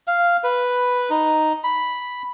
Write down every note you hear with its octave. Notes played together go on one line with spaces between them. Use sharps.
F5
B4
D#4
B5